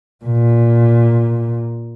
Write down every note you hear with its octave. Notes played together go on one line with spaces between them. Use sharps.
A#2